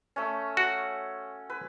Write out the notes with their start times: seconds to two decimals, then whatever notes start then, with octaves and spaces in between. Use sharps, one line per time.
0.16 A3 C#4
0.57 F#4
1.50 B4